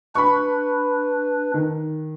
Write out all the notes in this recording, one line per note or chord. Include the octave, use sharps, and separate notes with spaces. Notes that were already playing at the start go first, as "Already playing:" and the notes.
D4 B4 B5 C#6
D#3